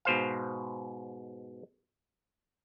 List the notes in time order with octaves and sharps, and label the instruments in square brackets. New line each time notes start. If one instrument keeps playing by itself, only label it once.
[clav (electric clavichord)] G#2 B2 C5 F5